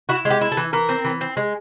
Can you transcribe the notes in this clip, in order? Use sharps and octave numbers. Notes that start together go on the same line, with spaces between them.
E4 F#4
G#3
G4
E4
A4
E3
E3 A#4
C4
E3
C4
G#3